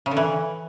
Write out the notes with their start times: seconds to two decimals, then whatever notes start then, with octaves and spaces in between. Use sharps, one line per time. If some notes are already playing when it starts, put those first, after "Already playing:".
0.06 C#3
0.11 D3
0.17 E3